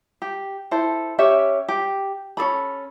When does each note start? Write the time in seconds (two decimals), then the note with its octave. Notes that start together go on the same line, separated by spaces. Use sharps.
0.22 G4
0.71 E4 A4 C5
1.18 C#4 G4 C#5 E5
1.68 G4
2.37 C#4 G#4 A4 B5